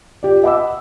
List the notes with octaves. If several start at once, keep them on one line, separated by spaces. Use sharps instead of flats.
F4 G4 D5
D#5 E5 F#5 B5 D6 E6